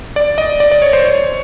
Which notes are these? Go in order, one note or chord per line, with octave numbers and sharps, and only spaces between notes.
D5
D#5
D5
D5
C#5
C5
C#5